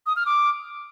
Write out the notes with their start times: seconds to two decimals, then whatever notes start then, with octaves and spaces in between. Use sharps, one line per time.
0.07 D#6
0.16 F6
0.26 D6